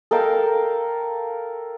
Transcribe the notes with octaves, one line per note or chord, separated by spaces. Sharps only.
A4 A#4 F5 G5